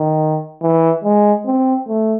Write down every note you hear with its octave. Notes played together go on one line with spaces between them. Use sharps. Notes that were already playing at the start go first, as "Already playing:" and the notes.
Already playing: D#3
E3
G#3
C4
A3